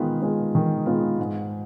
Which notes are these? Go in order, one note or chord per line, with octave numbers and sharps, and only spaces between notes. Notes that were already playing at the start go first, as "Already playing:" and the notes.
Already playing: D#3 G#3 B3 F4
G#3 B3 F4
D#3
G#3 B3 F4
G#2